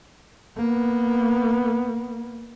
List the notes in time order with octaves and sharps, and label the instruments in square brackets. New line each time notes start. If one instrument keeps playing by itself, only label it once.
[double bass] A#3 B3